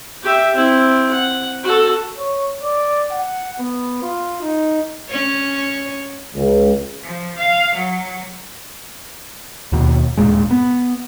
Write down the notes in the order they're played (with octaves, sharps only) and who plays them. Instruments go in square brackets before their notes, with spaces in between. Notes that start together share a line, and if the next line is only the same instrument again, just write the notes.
[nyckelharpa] G4 E5
C4 E4
F#5
F#4 A4
[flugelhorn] C#5
D5
F#5
B3
F4
D#4
[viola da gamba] C#4 C#5
[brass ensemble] C#2
[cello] F3
F5
F#3
[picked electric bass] D#2 B2
D#1 G2 A#2 G#3
B3